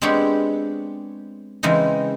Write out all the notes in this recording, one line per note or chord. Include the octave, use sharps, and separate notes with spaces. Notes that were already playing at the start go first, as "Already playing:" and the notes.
G#3 B3 C4 D4 G4 C#5
C#3 E3 G#3 C4 D#4